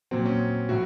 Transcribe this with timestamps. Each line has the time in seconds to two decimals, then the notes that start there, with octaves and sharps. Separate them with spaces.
0.11 A#2 F#3 C4
0.26 C#4
0.69 A2 F#3 F#4